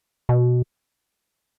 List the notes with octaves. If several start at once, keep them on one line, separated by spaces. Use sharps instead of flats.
B2